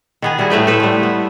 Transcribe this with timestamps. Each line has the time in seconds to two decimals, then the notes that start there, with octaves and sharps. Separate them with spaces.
0.22 D#3 B3 G#4
0.38 G3 E4 F#4 G#4
0.50 A2 A3 B4 G5
0.67 A4 B4 C5 E5
0.80 G3 A3
1.03 B3